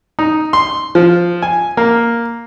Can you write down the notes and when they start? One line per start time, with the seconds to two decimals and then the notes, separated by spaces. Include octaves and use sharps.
0.19 D#4
0.53 C6
0.95 F3
1.42 G#5
1.77 A#3